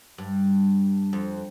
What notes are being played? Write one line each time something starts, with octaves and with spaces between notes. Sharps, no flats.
G2
F2